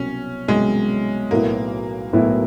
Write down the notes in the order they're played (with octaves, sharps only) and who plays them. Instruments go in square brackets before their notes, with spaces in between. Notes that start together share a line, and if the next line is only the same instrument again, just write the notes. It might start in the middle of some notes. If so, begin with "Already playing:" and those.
Already playing: [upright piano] C2 B2 F#3 [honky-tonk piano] C#4
[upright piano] C2 B2 F#3 [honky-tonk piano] G#3
[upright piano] B1 A2 F#3 B3 E4 [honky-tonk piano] A#3
[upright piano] B1 A2 F#3 B3 E4